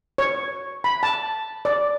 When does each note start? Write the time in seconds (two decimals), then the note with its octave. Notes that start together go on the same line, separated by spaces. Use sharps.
0.18 C#5
0.84 B5
1.03 A5
1.65 D5